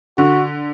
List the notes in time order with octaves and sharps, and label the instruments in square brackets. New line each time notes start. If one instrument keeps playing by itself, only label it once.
[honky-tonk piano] D3 [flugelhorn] F#4